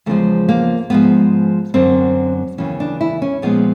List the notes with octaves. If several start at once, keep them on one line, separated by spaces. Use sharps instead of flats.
E2 C#3 F3 G#3 A3
A#3
G#2 F3 G#3 B3
F#2 D3 F#3 C4
D#2 C#3 E3 C#4
D4
E4
C#4
A#2 F3 G#3 B3